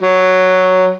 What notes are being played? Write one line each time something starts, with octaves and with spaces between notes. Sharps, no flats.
F#3